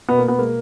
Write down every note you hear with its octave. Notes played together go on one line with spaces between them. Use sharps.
B2 B3
A#3
B2 B3
G#3 A#3